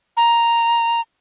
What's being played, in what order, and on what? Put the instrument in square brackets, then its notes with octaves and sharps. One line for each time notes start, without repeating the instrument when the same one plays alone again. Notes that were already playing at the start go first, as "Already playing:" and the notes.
[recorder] A#5